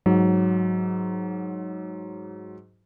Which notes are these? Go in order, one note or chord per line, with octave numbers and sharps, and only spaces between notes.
G#2 F#3